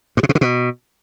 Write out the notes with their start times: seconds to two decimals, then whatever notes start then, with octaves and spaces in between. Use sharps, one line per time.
0.17 G2
0.23 C3
0.29 B2
0.35 D3
0.41 B2